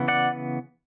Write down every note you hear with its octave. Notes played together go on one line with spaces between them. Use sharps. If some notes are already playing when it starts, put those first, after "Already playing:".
Already playing: C#3 E3 B3
D5 F#5